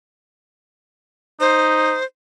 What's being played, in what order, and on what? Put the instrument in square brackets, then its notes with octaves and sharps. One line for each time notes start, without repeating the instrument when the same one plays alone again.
[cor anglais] D#4 [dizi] C5